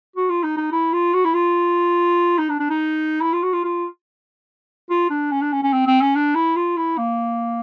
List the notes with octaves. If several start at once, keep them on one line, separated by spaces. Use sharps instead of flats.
F#4
F4
D#4
D#4
E4
F4
F#4
E4
F4
D#4
D4
D4
D#4
E4
F4
F#4
F4
F4
F4
D4
C#4
D4
C#4
C#4
C4
C4
C#4
D4
E4
F4
E4
A#3